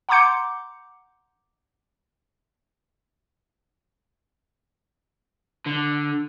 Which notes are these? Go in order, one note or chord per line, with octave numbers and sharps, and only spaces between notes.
F#5 A#5 C6 D6 G6 C#7
D3